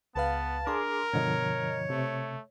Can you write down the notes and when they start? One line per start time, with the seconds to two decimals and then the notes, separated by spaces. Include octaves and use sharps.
0.16 C#2 B3 B4 F5 A5
0.67 D4 G#4 A#4 C6 D6
1.14 G2 B2 D3 F3 C#5 D#5
1.90 C3 A3